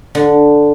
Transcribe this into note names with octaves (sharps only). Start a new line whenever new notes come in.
D3